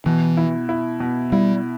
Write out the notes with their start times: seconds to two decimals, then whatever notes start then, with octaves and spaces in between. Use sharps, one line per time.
0.06 B2 E3
0.37 E4
0.69 E4
1.00 B2
1.32 G3 E4